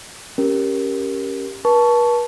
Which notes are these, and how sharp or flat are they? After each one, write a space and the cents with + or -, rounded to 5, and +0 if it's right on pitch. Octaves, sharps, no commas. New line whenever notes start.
C#4 +0 G4 +0 A#4 +0
B4 -45 A5 -5 C#6 +15